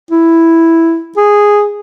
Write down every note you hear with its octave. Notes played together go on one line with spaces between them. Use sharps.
E4
G#4